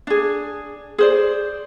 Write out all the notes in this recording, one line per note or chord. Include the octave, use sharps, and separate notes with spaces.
D4 G#4
G#4 C5 D5